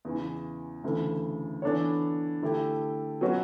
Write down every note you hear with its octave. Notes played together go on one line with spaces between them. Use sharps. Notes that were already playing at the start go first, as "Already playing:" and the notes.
E2 C#3 E3
D2 C#3 E3 A3
E3 B3 D4 A4 C#5
D3 A3 E4 G4
B2 F#3 C#4 F#4 B4